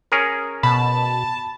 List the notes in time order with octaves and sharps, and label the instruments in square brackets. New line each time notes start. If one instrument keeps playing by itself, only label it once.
[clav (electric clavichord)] C#4 G#4 A#4
[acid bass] B2 [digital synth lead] A5 [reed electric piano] B5